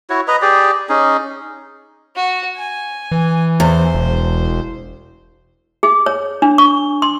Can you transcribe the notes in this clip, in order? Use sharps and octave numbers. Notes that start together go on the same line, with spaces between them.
E4 F#4 C#5
B4 D#5 A#5
G4 G#4 D5
C#4 D#4 G#4
F#4
G#5
E3
E2 C5
E1
G#4
C#5
D4
C#6
C6